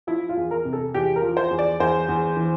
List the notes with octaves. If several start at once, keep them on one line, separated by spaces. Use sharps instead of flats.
F3 E4
F4
E2
A#4
C3
A4
E2 G4
A#4
F3
C5
E2
D5
E2 C5
E2
E3